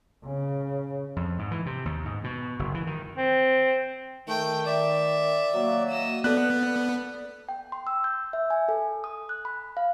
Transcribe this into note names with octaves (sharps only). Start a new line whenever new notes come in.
C#3
F2
G#2
E3
C3
D#2
G#2
B2
F#1
E3
D#3
C4
D#3 A3 G5
D5 E5
F#3 A#3
D#5 E6
B3 A4 D5 F#6
G5
C6
E6
G6
E5
G#5
A4
D#6
F#6
B5
F5